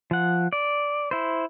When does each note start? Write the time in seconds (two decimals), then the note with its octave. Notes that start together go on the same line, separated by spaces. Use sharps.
0.11 F3 F#5
0.53 D5
1.11 E4 C5